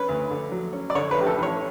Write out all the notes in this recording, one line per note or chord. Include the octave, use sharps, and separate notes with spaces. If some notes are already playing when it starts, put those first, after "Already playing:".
Already playing: C#4 B4
D2
D3
F#3
C#4
D5
D3 C#5
B4
A1 G4
A4
A1 C#5